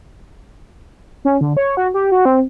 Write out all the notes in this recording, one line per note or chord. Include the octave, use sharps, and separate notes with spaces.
C#4
D3
C#5
F#4
G4
F#4
C4